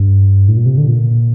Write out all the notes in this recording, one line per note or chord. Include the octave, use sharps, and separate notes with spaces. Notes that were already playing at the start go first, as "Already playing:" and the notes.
Already playing: G2
A2
A#2
C3
D3
A#2